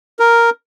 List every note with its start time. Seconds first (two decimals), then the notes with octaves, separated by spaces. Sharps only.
0.19 A#4